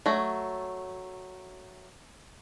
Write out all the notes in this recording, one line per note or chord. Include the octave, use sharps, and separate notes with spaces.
F#3 A3